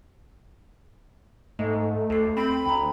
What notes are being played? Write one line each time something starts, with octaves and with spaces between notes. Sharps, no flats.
G#2 A3 D#5
D2 A4 C7
C4 B5
D2 G5 A#5